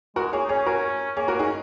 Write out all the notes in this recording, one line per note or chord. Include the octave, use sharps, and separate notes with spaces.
G#3 F#4 A#4
A#3 G#4 C#5
D#4
C#4 G#4 C#5
F#4 A#4
A#3 G#4 C#5
F#4 A#4
C#4 D#4 G#4